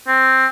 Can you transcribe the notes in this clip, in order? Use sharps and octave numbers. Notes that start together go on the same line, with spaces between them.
C4